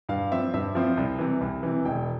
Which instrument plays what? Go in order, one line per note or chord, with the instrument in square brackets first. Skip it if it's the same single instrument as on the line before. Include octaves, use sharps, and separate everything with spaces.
[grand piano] G2 F5
F3 C4 E5
G2 E5
F3 C4
C2
C3 E3
C2
C3 E3
E1 G5